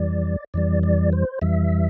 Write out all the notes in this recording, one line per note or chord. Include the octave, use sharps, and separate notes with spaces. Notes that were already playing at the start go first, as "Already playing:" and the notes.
Already playing: F2 E3 G3 D5
F2 E3 G3 D5
D5
C5
F2 E3 G3 E5